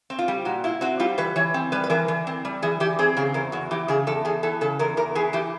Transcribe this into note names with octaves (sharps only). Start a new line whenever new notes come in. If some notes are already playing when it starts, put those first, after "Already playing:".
C4
F4
G3
A#2 F#4
E4 F4
C4 F#4
G3 F4
E3 B4
E3 C#5
C4
G3 B4
B4
E3 A#4
E3
C4
G3
E3 G#4
E3 G4
C4 G#4
C#3 G#4
E2 A#4
E2 F#4
E3 G4
C#3 G#4
E2 A4
E2 G#4
E3 A4
C#3 A4
E2 A#4
E2 A#4
E3 G#4
E3 G4